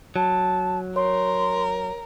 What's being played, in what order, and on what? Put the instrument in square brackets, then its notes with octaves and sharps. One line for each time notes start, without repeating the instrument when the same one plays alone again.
[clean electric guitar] F#3 [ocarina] A5
[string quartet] A#4 [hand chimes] C#5 [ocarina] C6